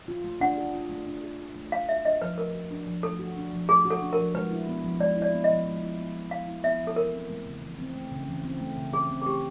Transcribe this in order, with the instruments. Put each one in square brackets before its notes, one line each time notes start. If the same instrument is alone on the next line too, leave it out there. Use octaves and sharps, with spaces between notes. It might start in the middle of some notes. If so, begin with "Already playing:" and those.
[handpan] F4
A3
[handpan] D4 [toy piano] F#5
[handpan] G#4
F4
A3
D4
G#4
F4
A3
[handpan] A3 [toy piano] F5
[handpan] F#4 [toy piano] E5
[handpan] D4 [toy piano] D#5
[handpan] F3 [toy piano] B4
[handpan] A3 [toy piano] A#4
[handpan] F#4
D4
F3
[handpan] A3 [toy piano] A4
[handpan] F#4
D4
F3
[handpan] A3 [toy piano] G#4
[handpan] F#4
[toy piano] A4
[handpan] D4
[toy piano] A#4
[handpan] F3
[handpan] G#3 [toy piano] B4
[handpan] E4
B3
F3
[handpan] G#3 [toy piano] D5
[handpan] E4
[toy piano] D5
[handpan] B3
[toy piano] D#5
[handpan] F3
G#3
E4
B3
F3
[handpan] G#3 [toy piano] F5
[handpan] E4
[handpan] B3 [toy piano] E5
[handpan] F3
[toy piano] A4
[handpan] E3 [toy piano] A#4
[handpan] C4
A3
C#3
E3
C4
A3
C#3
E3
C4
A3
C#3
[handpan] E3 [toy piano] G#4
[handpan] C4
[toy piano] G#4
[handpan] A3 [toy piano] G4